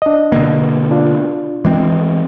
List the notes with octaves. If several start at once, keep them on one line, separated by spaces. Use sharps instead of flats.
D4 D#5
B2 D3 A#3
D4 F4
E3 G#3 C4